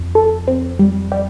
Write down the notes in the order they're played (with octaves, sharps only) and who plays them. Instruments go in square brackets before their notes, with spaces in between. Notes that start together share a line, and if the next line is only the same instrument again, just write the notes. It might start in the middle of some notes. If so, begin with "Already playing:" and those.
Already playing: [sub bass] F2
[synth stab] A4
C4
G3
G3